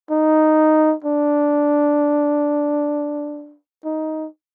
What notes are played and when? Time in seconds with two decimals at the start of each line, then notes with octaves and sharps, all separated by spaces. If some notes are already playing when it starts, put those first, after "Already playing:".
0.11 D#4
1.04 D4
3.85 D#4